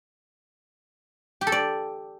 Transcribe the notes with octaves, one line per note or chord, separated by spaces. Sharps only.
G4
A4
D5